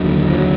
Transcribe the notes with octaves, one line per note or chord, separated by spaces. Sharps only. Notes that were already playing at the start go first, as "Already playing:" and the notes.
Already playing: F1 D#2 D3 F#3
F3
F#3